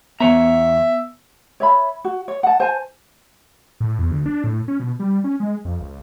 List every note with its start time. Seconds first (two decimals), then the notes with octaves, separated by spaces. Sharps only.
0.20 E2 B3 C#5 E5 A#5
1.60 C#5 E5 B5
2.05 F#4
2.28 C#5
2.43 F#5 A5
2.60 C5 G#5 A5
3.80 A2
3.99 E2
4.11 D2
4.26 D4
4.44 A2
4.68 C#4
4.80 B2
5.00 G3
5.24 C#4
5.40 G#3
5.65 F2
5.80 C#2